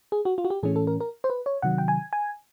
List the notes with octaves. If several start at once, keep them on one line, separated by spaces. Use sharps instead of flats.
G#4
F#4
F4
F#4
G4
A2 E3 A3 C#4 G#4
A4
A#4
A#4
C5
B4
C#5
C3 D#3 F#3 F#5
G5
G#5
G#5